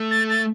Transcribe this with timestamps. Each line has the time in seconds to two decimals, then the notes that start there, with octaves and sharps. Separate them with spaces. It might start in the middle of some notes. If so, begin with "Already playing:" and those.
Already playing: A3
0.11 A6
0.30 A6